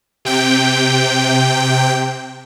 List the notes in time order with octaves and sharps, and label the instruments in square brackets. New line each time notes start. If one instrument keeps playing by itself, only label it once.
[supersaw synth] C3 G5